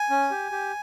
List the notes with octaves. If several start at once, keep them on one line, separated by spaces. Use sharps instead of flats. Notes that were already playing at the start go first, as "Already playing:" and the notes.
Already playing: G#5
C#4
G4
G4